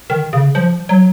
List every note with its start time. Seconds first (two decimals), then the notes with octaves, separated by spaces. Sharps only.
0.10 D#3
0.33 C#3
0.55 F3
0.89 F#3